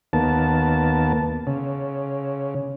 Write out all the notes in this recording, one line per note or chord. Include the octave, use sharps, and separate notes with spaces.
D#2 A#3 B3 A5
C#3